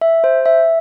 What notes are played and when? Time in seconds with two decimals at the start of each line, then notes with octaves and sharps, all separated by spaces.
0.01 E5
0.24 C5
0.46 E5